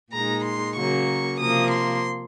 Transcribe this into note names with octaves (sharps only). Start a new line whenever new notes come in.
A#2 G#3 D#4 A#5
C6
C#3 F#3 A#3 C#6
C3 F3 A#3 D#6
C6